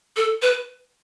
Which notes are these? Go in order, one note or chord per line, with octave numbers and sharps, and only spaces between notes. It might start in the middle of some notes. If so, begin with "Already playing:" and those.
A4
B4